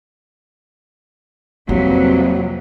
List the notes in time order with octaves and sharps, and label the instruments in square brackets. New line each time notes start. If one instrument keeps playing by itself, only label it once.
[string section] F2 E3 [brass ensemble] C3 G3 [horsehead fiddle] F#3 [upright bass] A#3